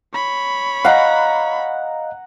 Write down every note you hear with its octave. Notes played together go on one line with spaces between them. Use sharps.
C#5 B5
D#5 F5 F#5 A#5